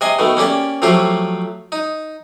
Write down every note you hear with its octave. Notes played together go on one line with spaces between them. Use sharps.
C3 D#5 G#5 C6
B2 D#3 A3
A#3 C#4 G4 D5
F3 F#3 A3 F4 G4 C5
D#4